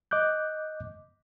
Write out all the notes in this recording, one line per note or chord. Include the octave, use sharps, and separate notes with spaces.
D#5 D6 F#6 G6